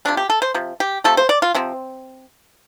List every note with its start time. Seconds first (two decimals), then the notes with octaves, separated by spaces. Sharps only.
0.05 C3 F3 A3 D4
0.17 G4
0.30 A4
0.42 C5
0.54 C3 F3
0.80 G4
1.04 C3 F3 A3 A4
1.17 C5
1.29 D5
1.42 F4
1.54 C3 F3 C4